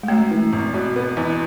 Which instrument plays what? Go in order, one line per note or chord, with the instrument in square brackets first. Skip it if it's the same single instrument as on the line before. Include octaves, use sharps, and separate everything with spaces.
[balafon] G#3
[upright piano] F#2 [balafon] A3
[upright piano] E3
G#1
B2
B3
E2